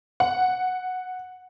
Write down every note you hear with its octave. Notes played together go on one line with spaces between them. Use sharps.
F#5